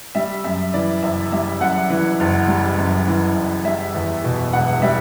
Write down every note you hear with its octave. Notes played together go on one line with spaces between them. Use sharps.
G3 E5
F#2 E5
E3 D5
F#1 E5
G3 E5
F#2 F#5
E3
F#1
G3
F#2
E3
F#1
G3 E5
E2
B2
E1 F#5
G3 E5